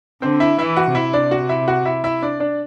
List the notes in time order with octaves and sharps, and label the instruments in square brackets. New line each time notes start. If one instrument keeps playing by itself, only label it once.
[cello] D3 [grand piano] C4 C5
[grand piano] E4 E5
[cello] E3 [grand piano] E4 E5
[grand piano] F#4 F#5
[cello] C3 [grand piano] E4 E5
[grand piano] D4 D5
F#4 F#5
E4 E5
F#4 F#5
E4 E5
E4 E5
D4 D5
D4 D5